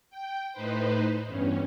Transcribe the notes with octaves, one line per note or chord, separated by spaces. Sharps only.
G5
A2 D#4 B4 C5
E2 G2 C#4